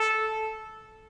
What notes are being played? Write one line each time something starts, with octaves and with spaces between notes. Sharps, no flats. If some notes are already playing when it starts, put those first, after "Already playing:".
Already playing: A4